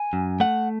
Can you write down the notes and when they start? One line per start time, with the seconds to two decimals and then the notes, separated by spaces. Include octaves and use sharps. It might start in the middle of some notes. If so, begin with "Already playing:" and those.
Already playing: G#5
0.13 F#2
0.40 A3 F#5